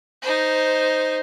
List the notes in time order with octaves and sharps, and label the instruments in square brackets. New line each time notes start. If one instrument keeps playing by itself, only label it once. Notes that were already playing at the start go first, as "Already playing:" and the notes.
[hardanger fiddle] D#4 C5